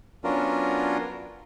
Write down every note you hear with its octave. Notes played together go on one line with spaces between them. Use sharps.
F#3 B3 C#4 D4 F4 A#4